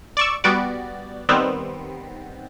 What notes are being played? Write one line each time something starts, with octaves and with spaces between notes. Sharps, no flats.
D5 C#6 E6
G3 B3 F#4 D5
D#3 G3 B3 C4